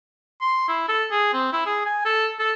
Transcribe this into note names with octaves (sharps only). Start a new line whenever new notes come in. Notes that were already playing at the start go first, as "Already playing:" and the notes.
C6
E4
A4
G#4
C4
E4
G#4
G#5
A4
A4